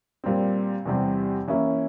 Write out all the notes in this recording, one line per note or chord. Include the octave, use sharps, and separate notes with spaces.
A#2 G3 C4
E2 C3 G3 C4
E3 A#3 C#4 E4